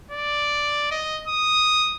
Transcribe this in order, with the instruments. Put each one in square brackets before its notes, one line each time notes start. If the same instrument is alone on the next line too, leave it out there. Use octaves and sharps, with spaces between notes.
[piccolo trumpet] D5
D#5
D#6